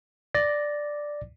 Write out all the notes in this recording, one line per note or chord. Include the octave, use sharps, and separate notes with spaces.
D5 D6 A6 A#6